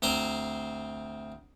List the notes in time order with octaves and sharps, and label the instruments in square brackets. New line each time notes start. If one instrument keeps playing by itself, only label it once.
[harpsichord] D2 C4 C5 A#5